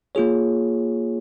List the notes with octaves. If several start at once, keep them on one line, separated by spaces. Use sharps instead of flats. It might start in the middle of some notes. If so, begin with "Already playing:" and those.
A#3 F4 G#4 C#5